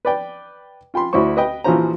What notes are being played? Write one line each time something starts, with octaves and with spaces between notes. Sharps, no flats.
B4 D5 G5
F4 G5 B5 C6
D2 E4 F#4 C5 C#6
B4 D#5 G5
A#1 E3 F3 F#4 C5 A#5